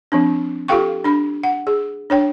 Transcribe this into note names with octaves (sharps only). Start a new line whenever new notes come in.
F3 C4 D4
F4 G4 A4 F5 G5 C#6
D4 B5
F#5
G#4
D4 C#5 G5